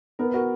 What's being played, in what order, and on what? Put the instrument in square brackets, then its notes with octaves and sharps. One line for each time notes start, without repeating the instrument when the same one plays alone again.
[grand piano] B3 [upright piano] A#4
[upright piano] B4
[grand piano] F#4 [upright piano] A#4